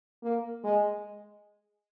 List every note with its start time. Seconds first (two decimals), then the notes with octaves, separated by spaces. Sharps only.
0.23 A#3
0.64 G#3